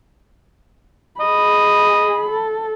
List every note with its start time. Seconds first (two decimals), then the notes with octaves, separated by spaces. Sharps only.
1.20 G#4 D#5 B5
2.29 A4